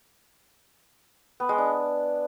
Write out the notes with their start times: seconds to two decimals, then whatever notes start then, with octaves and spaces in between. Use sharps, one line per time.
1.40 B3
1.49 G#3
1.58 D4